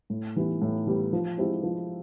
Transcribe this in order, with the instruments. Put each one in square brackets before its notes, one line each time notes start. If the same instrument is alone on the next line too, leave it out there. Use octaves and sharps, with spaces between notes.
[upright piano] A2
E3 G3 B3
A2
E3 G3 B3
F3
G#3 C4 E4 G4
F3